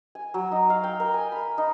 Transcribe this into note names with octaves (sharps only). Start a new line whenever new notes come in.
G#5
F#3
D#4
F5
G5
A#4
G#5
B5
D#4